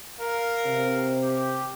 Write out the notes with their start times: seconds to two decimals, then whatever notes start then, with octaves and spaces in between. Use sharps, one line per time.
0.19 A#4 F5
0.66 C3
1.21 G4